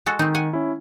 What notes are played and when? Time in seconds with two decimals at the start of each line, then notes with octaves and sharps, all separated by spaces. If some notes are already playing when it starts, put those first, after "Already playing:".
0.06 G#3 F#4 A4
0.19 D#3 C4 D#4
0.35 F#5 G#5
0.53 C#4 E4